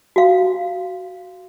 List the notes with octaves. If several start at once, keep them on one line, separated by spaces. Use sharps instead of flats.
F#4 F5